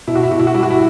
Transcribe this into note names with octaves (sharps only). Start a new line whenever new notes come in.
B2 E4
F#4
E4
B2 F#4
E4
F#4
G3 E4
F#4
E4